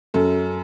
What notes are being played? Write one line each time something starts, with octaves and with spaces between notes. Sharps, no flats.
F#2 A4